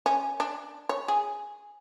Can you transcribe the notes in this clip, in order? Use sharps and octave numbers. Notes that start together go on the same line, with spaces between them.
C#4
D4
C#5
G#4